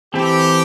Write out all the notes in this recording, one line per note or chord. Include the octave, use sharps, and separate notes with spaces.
E3 C4 G4 A4